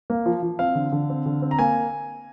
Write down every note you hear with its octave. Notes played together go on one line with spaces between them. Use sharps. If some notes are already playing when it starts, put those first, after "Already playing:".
A#3
F3
F3
C4 F5
D3
D3
C4
D3
C4
A#5
A#3 G#5